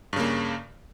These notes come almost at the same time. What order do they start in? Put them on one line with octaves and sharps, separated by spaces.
G2 C#3 A#3